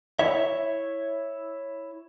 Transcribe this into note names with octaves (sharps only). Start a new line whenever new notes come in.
E4 C#5 E5